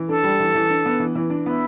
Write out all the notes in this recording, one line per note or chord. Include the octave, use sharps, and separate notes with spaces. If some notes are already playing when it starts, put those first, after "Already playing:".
Already playing: E3
D4 A4
G3
E3
E3
D4
B3
E3
E3
D4
B3 E4